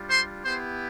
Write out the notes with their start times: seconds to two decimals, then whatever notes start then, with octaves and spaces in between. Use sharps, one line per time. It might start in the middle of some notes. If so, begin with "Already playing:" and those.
Already playing: G3 D4 F4
0.10 C5 C6
0.45 B3 E4 G4 C5 C6